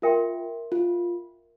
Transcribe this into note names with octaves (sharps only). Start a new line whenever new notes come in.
F4 A#4 E5 G5 C6
F4